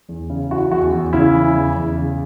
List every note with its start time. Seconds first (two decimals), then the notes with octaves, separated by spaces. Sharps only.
0.09 E2
0.30 C#3
0.50 E3 F#4
0.72 E2 F#4
0.92 E2
1.13 C#3 E4
1.34 E3
1.55 E2
1.75 E2
1.96 C#3